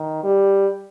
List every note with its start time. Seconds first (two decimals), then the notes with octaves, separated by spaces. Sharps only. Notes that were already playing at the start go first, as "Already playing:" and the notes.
Already playing: D#3
0.24 G3